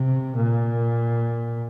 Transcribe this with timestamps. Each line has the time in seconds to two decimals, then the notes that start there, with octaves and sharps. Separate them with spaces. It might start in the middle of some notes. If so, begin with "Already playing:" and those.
Already playing: C3
0.36 A#2